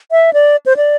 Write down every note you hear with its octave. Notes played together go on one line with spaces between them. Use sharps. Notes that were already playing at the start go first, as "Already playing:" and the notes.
E5
D5
C5
D5